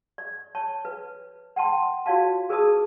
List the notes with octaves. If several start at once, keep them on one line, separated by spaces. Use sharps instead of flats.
D5
C#5 A5
B4
F#5 G5 A5 C6
F4 F#4 C#5 D5 F5 A5
G#4 A#4 B4 D5 A5 D#6